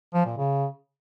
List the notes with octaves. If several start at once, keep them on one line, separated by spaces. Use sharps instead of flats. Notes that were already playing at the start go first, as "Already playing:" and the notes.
F3
A#2
C#3